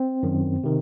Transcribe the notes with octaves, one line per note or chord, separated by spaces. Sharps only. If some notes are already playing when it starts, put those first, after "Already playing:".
Already playing: C4
F#2 D#3
C3 D#3